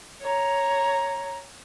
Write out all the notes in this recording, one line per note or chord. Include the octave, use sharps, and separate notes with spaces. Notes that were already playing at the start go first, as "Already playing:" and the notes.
C#5 A#5